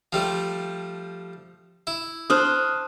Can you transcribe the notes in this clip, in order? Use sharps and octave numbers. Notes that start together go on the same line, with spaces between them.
F3 G3 A3
E4
D4 C5 D#6 F6 F#6